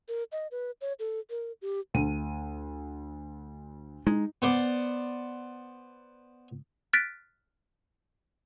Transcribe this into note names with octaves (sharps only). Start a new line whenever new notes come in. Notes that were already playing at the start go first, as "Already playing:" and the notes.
A#4
D#5
B4
C#5
A4
A#4
G4
D2 D#7
G#3 D#4
B3 C5 D5
F6 F#6 A6 B6 D7